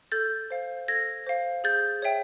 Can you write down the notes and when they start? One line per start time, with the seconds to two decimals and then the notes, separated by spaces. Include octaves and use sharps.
0.12 A4 G6 A6
0.51 C5 F5
0.88 A4 G#6 A#6
1.26 C5 F5
1.64 G#4 G6 A6
2.02 C#5 E5 G5